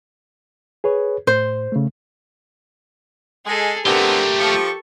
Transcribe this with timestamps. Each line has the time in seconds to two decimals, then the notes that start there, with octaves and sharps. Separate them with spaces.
0.84 G#4 B4 C#5
1.27 A2 C5
1.72 C#3 A3
3.46 G#3 G#4 A4
3.86 D3 A3 B3 C4 F4 G4 A#4
4.39 F3 A4 C#6